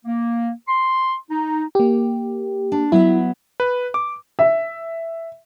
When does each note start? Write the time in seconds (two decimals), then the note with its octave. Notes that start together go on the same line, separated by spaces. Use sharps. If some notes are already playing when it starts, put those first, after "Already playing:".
0.05 A#3
0.68 C6
1.30 D#4
1.75 A#3 G4
2.72 D4
2.92 F#3 B3 E4 E5
3.60 B4
3.94 D6
4.39 E5